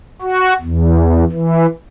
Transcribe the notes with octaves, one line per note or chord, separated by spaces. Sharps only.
F#4
E2
E3